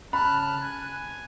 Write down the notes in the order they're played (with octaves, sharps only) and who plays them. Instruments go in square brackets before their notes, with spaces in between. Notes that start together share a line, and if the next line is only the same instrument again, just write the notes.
[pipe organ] C#3 A5 F6 [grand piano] B5 [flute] F#6
[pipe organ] G#5